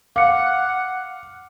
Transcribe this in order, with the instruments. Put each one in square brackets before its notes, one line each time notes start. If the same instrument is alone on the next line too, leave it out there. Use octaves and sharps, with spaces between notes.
[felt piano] F5 [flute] F#5 [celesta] D6 C#7